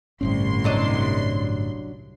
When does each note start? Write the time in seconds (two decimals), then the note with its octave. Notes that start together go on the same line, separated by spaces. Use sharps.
0.21 G1 C2 A2 C#4 C6
0.64 F#3 D4 D#5